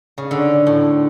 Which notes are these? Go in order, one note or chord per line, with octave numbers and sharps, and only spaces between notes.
C#3
D3
A2